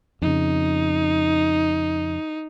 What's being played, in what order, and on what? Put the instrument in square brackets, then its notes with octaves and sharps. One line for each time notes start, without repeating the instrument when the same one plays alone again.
[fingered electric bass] F2 C#3 [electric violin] D#4